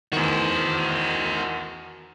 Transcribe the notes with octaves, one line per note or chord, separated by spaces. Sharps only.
E2 D#3 F#4 C5